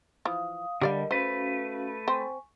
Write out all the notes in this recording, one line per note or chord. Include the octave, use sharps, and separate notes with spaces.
E3 F3 F5 D#6
D3 G3 G4 A#4 D5 D#5 F5
A3 C#4 F#4 B4 C5 F5
C4 C5 G#5 C#6